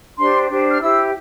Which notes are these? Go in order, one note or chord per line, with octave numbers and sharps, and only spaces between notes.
D4 G4 C5 C6
D4 G4 C5
F6
E4 G4 C5 E6